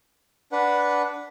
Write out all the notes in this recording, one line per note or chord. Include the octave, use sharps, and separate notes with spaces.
D4 B4 F#5